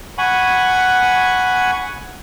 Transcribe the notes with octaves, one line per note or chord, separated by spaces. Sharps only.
F#5 G#5 B5 C#6